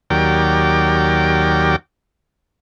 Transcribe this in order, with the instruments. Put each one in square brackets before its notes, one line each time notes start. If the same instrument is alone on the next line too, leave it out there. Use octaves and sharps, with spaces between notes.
[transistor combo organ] D#2 F#3 G4 A#4 D5 G5